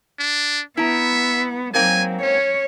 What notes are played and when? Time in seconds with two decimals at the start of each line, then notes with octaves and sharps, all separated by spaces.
0.19 D4
0.77 B3 E4 E5 A#5
1.74 G#2 F#3 A#3 C4 G#5
2.22 C#4 C#5